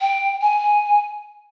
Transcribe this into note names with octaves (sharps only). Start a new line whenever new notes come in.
G5
G#5